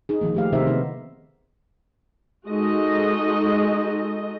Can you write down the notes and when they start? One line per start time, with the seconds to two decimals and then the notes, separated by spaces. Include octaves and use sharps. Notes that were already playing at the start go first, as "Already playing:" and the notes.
0.09 D#4 G#4
0.21 D#3 F3 A#3
0.34 A3 G4 F5
0.52 C3 D#3 D#4 A#4 C5 E5
0.67 B3 D#4
2.49 G#3 D#4 F#4 A4 D#5